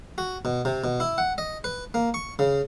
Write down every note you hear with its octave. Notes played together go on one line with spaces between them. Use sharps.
F#4
B2
C3
B2
E4
F#5
D#5
B4
A#3
C#6
C#3